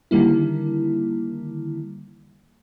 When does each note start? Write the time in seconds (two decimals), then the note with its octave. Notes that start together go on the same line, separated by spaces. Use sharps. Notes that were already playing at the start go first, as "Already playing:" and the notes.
0.11 D3 D#3 G3 A#3 E4